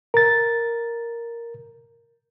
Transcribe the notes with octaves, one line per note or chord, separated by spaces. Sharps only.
A#4 A6